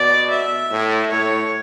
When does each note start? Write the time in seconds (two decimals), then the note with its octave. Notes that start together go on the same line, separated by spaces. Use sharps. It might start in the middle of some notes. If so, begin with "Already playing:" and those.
Already playing: B2 D5
0.30 E5
0.71 A2
1.11 A2 C#5